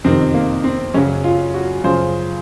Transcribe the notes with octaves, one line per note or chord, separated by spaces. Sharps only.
F2 C3 D#3 C4
A#3
C4
F#2 C#3 F#3 C#4
F4
F#4
F#2 C#3 F3 C5